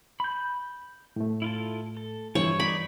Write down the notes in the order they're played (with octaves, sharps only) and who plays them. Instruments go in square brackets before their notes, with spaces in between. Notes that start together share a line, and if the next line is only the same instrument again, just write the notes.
[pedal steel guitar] B5 G6
[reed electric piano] A2 A3
[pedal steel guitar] E4 F4 A4
A4
[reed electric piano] G2 E3 [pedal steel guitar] F3 E4 [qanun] C#5
[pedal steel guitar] D#4 D5 [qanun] B5